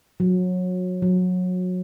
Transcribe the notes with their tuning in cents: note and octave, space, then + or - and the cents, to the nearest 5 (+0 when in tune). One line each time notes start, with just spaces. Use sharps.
F#3 -25
F#3 -25